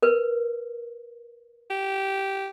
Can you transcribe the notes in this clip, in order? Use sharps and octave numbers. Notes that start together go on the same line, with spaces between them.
A#4 B4
G4